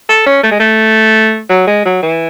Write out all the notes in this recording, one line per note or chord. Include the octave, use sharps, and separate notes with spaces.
A4
C#4
A3
G#3
A3
F#3
G#3
F#3
E3